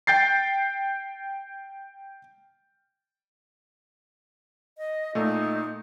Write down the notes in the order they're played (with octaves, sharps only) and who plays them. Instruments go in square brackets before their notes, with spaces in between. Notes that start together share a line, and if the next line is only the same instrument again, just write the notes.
[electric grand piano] G5 G6 A6 C7
[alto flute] D#5
[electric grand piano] A#2 A3 [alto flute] D#4